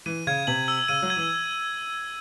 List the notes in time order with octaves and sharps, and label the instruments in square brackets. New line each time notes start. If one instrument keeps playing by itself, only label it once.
[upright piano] E3 [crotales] D#7
[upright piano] C#3 [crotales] G#6
[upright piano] C3 [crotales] F#7
[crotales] E6
[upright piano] C#3 [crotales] D#7
[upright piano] F#3
[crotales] G#6
[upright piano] E3